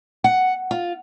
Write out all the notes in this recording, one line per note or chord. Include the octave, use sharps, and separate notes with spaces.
F#5
F4